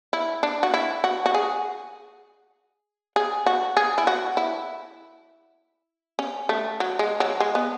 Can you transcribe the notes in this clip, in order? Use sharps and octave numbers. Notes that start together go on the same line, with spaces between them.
E4
D4
F#4
E4
F#4
F#4
G#4
G#4
F#4
G#4
E4
F#4
E4
C#4
A3
F#3
G#3
F#3
G#3
B3